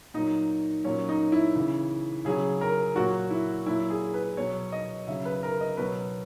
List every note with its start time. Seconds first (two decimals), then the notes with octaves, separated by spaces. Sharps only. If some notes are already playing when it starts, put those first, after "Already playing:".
0.14 A#2 F#3 D#4
0.84 A#2 F#3 C#4
1.09 D#4
1.32 E4
1.56 C#3 E3
2.25 C#3 F#3 G#4
2.61 A#4
2.96 A#2 F#3 F#4
3.30 E4
3.66 A#2 F#3 E4
3.90 G#4
4.14 B4
4.37 B2 F#3 C#5
4.72 D#5
5.07 C#3 F#3 E5
5.25 B4
5.43 A#4
5.61 D#5
5.77 B2 F#3 B4